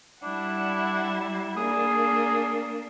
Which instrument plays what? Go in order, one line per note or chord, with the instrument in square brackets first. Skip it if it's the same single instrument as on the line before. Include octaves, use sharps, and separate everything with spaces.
[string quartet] G3 E4 F#5 [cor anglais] D4
[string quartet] A#3 D4 [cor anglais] G#4